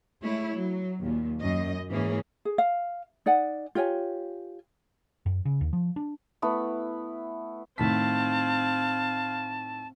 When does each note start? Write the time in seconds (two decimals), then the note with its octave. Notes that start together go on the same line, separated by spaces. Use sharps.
0.22 G#3 A3 E4 C#5
0.54 F#3
1.01 D#2 A#2
1.41 F#2 D#5
1.89 G#2 E3 A#3 C#4 G#4
2.45 G#4
2.58 F5
3.26 D#4 D5 F#5 G#5
3.75 F4 G4 C#5 G#5
5.26 F#2
5.45 C#3
5.61 D#2
5.73 F3
5.96 D4
6.42 A3 B3 E4
7.78 A2 D#3 C4 F5 A5 B6